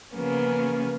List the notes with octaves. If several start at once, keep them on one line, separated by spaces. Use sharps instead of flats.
C#3 F3 A#3 B3 C#4